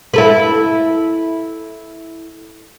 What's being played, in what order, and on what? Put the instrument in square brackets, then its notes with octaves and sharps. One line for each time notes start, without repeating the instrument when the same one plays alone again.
[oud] E4 A4 B4